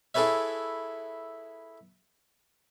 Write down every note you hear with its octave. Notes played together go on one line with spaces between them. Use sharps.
E4 G#4 A4 B4 C#5 E5